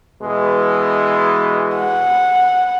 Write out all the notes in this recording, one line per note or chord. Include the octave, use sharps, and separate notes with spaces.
B2 E3 G#3
F#5